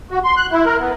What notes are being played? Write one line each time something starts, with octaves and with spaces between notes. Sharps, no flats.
F#4
C6
F#6
E4
A#4
B3